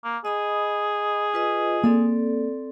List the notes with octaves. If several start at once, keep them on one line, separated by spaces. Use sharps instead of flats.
A#3
G#4 D#5 B5 D#6
F4 B4 D#5
A#3 C4 A4 D5